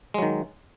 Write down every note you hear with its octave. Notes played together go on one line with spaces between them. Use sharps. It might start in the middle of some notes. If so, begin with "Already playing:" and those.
D#3 F#3 G#3